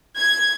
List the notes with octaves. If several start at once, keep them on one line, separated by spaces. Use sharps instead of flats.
G#6